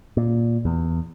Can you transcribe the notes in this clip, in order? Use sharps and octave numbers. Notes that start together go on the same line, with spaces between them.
A#2
E2